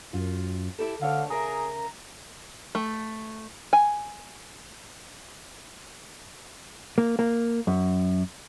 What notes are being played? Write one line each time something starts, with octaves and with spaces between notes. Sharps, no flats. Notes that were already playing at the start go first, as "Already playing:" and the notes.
F#2 F4
E4 G4 A4
D2 D3 D4 C#5 F5
C#3 G#4 A#4 E5 A#5
A3
G#5
A#3
A#3
F#2